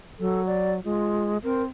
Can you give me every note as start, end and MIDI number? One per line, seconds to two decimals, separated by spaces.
0.20 0.83 54
0.20 0.42 69
0.47 0.72 74
0.84 1.38 56
0.84 1.32 65
1.44 1.63 60
1.44 1.63 70